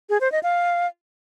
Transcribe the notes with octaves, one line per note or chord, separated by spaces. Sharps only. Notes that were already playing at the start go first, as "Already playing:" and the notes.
G#4
C5
D#5
F5